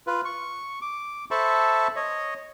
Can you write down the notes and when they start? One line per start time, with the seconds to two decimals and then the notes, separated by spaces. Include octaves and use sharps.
0.07 F4 B4
0.25 C#6
0.82 D6
1.31 A4 C5 E5 A5 B5 C#6
1.96 C#5 D#5